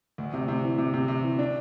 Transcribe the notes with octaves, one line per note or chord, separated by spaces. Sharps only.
D2
C3
C3
E3
C3
C3
C3
E3
D4